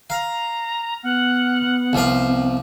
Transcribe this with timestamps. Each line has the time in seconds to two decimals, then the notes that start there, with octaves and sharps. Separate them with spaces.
0.10 F5 A#5
1.03 B3 F#5 F6
1.93 C2 F3 C4 F5